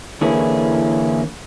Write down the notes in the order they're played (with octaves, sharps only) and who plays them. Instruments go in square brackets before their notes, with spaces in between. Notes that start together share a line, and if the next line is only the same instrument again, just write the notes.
[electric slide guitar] D3 E3 A#3 C#4 E4 G#4